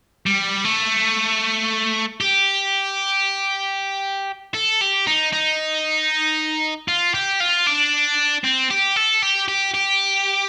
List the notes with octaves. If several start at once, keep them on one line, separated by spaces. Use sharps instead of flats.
G3
A3
G4
A4
G4
D#4
D#4
F4
G4
F4
D4
C4
G4
A4
G4
G4
G4